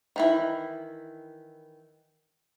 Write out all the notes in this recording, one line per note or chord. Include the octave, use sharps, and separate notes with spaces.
D#3 E3 E4